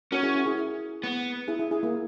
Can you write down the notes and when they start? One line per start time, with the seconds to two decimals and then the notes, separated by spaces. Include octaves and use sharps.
0.12 C#4 F#4 A#4
0.23 E4 G#4
0.35 F#4
0.46 E4 G#4
0.57 E4 G#4
1.03 B3
1.48 E4 G#4
1.59 E4 G#4
1.71 E4 G#4
1.83 A#3